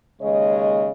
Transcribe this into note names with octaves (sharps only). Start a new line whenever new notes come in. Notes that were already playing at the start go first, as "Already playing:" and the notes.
D#2 C#3 G#3 C#5 D#5